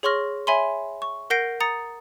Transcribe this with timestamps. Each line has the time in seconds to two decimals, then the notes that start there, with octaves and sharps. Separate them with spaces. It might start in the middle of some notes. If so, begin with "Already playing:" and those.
0.03 G#4 C#5 C6 C#6 F6 A#6
0.47 C#5 E5 G#5 B5 C6
1.02 C#6
1.30 A#4 F#5 G6 A#6 C7 D7
1.60 A#5 D#6 A6 C#7